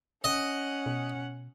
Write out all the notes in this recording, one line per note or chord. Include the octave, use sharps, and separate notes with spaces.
C#4 D#5 F#5
B2